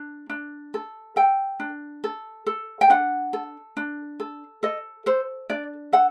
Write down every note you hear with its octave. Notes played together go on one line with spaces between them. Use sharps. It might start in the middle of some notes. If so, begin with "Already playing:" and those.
Already playing: D4
D4
A4
A4 G5
D4
A4
A4
G5
D4 F#5
A4
D4
A4
A4 D#5
A4 C5
D4 D5
A4 F#5